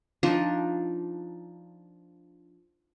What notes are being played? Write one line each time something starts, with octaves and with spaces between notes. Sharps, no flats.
F3 D4 D#4